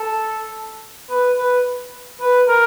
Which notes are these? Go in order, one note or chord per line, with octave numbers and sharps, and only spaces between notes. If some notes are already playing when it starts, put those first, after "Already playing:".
Already playing: A4
B4
B4
B4
A#4